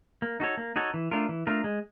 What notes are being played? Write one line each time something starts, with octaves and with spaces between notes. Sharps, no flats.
A#3
D#4 F#4 A4 C#5
A#3
D#4 F#4 A4 C#5
E3
A3 D4 F4 A#4
E3
A3 D4 F4 A#4
G#3